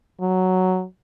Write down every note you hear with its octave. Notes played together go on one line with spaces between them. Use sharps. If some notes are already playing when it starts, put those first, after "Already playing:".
F#3